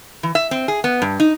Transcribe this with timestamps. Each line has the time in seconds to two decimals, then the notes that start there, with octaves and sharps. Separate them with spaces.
0.23 E3
0.35 E5
0.51 C4
0.68 G#4
0.84 B3
1.02 G2
1.20 D#4